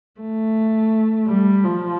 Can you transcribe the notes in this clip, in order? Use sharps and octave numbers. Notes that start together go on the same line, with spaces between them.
A3
G3
F3